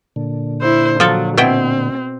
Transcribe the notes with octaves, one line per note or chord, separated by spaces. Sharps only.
A#2 D3
E4 C5
F3 F#3 A4
B2 C4 E4 G5